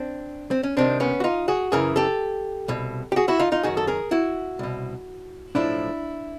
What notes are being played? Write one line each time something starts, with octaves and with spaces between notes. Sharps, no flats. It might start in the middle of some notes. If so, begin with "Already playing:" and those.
Already playing: C4 D4
C4
C#4
C2 C3 D#3 C4 D4
B3 C#4
F#4
D#4 F4
F#4 G#4
F#2 C#3 E3 G#4 A#4
G4 A4
C2 B2
G4
F#4 G#4
E4 F#4
D#4 F4
D#4 F4
F#2 D#3 F#4 G#4
A4
G#4 A#4
E4 F#4
C2 B2
B1 A2 F3 D4 E4